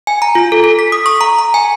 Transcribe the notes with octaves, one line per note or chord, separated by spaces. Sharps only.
G#5
A#5
F4
A4
A4
B6
D#6
C#6
A#5
A#5
G#5